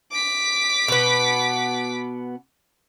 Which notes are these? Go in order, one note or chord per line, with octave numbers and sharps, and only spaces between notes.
D6 B6
B2 B3